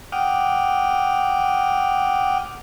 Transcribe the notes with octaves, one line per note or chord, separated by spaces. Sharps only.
F#5 G5 D6 D#6 F6